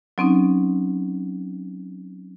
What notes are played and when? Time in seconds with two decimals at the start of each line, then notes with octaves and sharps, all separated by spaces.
0.18 F#3 C4 C#4 D#4